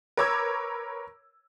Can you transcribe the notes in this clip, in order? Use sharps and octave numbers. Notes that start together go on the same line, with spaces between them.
A#4 B4 C#5 D6 E6 G#6